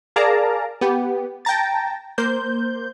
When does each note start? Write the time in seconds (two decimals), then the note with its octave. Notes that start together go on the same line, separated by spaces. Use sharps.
0.16 G#4 A#4 D5 F5 A5 A#5
0.81 B3 G4
1.45 G5 A5 A#5 A6
2.18 A#3 C5 G6